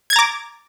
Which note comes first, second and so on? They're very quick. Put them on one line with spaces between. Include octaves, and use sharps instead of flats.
G#6 A6 A#5 D6